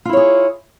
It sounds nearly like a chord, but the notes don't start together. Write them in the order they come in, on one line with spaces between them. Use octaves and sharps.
F4 E4 C#5 G#4